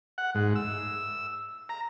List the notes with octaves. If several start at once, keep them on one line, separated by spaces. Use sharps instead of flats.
F#5
G#2
E6
A#5